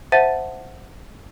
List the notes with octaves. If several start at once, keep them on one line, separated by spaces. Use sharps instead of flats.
C5 E5 F#5 A5 A6 D#7